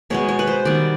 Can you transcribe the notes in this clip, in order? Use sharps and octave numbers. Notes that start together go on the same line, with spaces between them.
B2 G#3 B3 C#5
C#5
B4
C5
D#3 G3 B3 D5